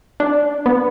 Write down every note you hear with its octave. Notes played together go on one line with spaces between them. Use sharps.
D4
B3